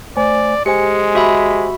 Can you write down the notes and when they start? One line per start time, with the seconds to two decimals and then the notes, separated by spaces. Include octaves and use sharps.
0.17 A3 C5 D5 G#5
0.66 G#3 G4 C5 G#5 C#7
1.15 F#4 E5 B5